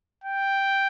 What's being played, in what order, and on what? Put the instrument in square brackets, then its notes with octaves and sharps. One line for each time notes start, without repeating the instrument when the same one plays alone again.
[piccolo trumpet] G5